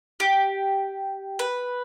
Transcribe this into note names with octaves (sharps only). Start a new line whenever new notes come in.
G4
B4